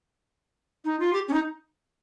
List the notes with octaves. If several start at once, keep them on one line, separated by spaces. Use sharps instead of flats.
D#4
F4
G4
C#4
D#4